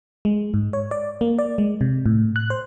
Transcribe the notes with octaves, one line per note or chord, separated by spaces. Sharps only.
G#3
G#2
C#5
D5
A#3
D5
G#3
C3
A2
F#6
C5